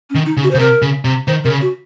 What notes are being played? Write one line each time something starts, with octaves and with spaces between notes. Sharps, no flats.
C#4
D#3
D#4
C#3
F#4
C5
C#3
C3 A#4
C#3
C3
D#3 C5
C3 A#4
C#3
F#4